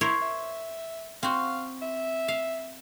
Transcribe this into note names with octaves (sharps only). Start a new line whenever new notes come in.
E4 A#4 C5 C#5
E5
C4 F#4 F5
E5
F5